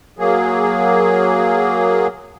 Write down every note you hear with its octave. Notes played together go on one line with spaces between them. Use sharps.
F#3 A#3 G#4